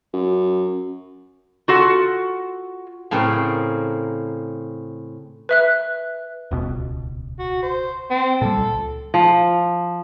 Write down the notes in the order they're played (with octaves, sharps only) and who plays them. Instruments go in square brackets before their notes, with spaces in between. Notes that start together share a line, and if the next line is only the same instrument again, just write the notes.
[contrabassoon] F#2
[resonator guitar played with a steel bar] F4 F#4 A4 F#5
[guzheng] A2 C#3 C4 A#4
[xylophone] B4 E5 F#6
[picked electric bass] D#1 C#2 B2
[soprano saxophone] F#4
C5
C4
[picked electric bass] A#2 G3 [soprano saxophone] A4
[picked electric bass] C#2
[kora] F3